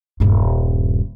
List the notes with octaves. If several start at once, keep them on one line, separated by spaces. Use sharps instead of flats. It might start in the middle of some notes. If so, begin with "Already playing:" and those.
D#1 G2